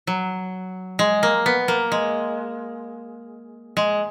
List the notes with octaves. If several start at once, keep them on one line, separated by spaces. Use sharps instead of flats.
F#3
G#3
A#3
B3
A#3
G#3
G#3